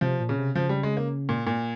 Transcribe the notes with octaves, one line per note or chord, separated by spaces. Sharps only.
C3 F3
A#2
C#3
C3
C#3 F3
G3
G#3
A#3
A#2
A#2